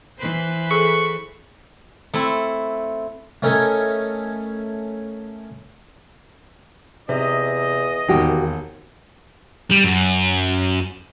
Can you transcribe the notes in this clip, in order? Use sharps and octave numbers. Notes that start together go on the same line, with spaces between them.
E3 B4 C5
G#4 A4 C#6
A3 C4 E4
A3 C#4 A#4 D#5 E5 G#5
E2 C3 D#5
E1 D#2 A#3 F#4 G4
G3
F#2